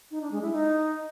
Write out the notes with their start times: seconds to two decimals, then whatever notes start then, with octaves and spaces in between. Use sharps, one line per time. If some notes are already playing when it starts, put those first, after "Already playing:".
0.11 D#4
0.21 D4
0.32 G#3
0.42 E4
0.52 D#4